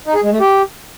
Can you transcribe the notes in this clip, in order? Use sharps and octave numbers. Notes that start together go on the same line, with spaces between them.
D#4
G#4
G#3
A3
G4